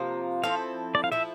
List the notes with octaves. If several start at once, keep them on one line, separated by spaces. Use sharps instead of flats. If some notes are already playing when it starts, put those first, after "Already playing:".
Already playing: C3 F3 A#3
F3 C4 E4 A4 F5
D5
F5
F3 A3 E4 E5